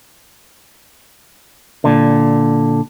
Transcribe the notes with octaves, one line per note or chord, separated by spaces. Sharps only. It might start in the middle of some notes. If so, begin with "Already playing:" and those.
A#2 D3